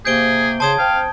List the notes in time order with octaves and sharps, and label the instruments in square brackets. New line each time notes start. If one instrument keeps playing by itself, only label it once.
[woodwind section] C3 A#3 [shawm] G#4 [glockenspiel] G6 D7 G7
[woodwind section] C#3 [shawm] C5 [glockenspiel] A5 D#6 G#6
[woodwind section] C4 G5 [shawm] F5